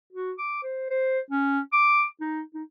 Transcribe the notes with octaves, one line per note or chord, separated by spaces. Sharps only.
F#4
D6
C5
C5
C#4
D6
D#4
D#4